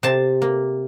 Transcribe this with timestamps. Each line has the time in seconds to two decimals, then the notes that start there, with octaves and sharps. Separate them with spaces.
0.03 C3 A5
0.42 A#3